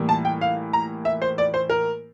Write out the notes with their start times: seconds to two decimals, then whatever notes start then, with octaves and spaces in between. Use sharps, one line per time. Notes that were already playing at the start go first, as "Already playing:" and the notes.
Already playing: A2 E3 G3 A#3
0.09 A5
0.25 G5
0.41 F5
0.73 A#5
1.05 E5
1.22 C5
1.38 D5
1.54 C5
1.70 A#4